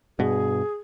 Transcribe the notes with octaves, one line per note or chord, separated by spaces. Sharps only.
G2 B2 G#4